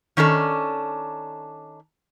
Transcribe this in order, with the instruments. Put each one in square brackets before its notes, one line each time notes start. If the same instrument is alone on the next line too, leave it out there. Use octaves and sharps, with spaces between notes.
[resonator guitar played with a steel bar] D#3 C#4 D4 A4